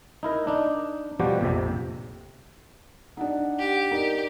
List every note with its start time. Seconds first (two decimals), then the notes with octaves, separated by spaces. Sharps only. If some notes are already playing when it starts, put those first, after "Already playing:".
0.23 D#4 E4 A#4
0.47 D4 D#4
1.19 B2 F3 G3 F#4 G4
1.41 A#1 F2 C3
3.17 D4 D#4 F#5
3.59 G4
3.92 D#4 A#4 D5